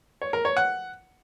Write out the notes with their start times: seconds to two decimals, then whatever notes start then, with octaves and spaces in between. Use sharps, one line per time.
0.22 C#5
0.33 A#4
0.45 C#5
0.57 F#5